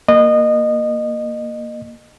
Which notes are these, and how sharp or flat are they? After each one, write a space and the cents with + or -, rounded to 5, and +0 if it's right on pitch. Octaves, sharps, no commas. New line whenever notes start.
A#3 +0 D#5 -25